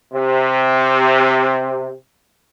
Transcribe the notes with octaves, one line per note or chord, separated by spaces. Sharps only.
C3